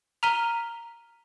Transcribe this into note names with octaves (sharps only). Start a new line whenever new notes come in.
A#5 F6 B6 D#7 F7 G7